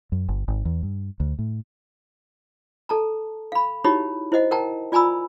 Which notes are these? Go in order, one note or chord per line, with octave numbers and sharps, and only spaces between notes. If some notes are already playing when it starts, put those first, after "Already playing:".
F#2
G1
G#1
E2
G2
D2
A2
A4 A5 A#5
F5 B5
D#4 E4 F#4 G4 C#5 B5
E4 C5 D#5 F#5
A#4 F#5 G5 A5 A#5
F4 D5 G#5 A#5 B5 E6